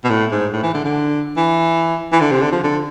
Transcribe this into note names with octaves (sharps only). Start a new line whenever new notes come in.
B2
A2
G#2
A2
E3
D3
D3
E3
E3
D3
C3
D3
F3
D3